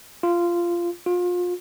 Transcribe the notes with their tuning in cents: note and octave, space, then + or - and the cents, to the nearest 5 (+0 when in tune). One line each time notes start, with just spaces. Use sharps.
F4 -15
F4 +30